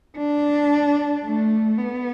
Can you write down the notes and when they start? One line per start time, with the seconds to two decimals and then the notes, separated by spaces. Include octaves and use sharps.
0.18 D4
1.24 A3
1.78 B3